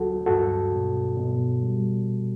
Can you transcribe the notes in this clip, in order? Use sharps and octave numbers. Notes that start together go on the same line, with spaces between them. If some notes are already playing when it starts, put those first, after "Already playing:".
Already playing: D2 F#3 F#4 A4
G2 F#4 A4
B2
B2
G3